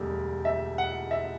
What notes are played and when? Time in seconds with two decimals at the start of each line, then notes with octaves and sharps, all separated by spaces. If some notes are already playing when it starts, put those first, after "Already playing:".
Already playing: E1 D2 G3
0.45 E5
0.78 F#5
1.11 E5